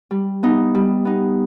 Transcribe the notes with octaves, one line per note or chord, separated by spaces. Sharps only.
G3
B3 D#4
G3
B3 D#4